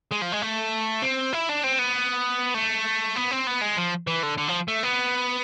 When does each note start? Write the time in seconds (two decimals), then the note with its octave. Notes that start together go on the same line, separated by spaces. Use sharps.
0.11 G#3
0.22 F3
0.32 G#3
0.42 A3
1.02 C4
1.33 E4
1.49 D4
1.63 C4
1.79 B3
2.55 A3
3.16 B3
3.31 C4
3.47 B3
3.61 G#3
3.77 F3
4.07 E3
4.23 D3
4.38 D3
4.48 F3
4.68 A3
4.83 B3